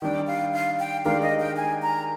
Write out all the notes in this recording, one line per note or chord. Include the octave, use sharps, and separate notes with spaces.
D#3 G3 D4 G5
F5
F5
G5
D#3 G#3 D4 G4 A#4 F5
D#5
G5
G#5
A#5